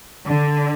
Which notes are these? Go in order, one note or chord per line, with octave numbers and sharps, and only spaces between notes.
D3